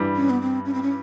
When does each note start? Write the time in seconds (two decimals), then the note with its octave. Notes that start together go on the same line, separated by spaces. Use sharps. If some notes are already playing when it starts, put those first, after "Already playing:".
Already playing: G2 E3 G3
0.16 C#4
0.30 B3
0.42 C4
0.65 C#4
0.74 C4
0.83 C#4